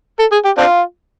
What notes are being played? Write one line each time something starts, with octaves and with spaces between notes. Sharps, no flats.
A4
G#4
G4
C4 D4 F4